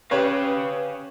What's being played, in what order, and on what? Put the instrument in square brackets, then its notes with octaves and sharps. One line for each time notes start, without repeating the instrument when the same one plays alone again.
[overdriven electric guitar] C#4 F5 [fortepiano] G4 C#5 [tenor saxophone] B4